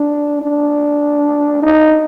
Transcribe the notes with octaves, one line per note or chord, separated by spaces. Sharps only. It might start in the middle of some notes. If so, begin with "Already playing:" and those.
Already playing: D4
D4
D#4